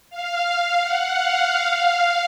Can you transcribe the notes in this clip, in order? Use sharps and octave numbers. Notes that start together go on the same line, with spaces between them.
F5
F5
F#5
F5
F5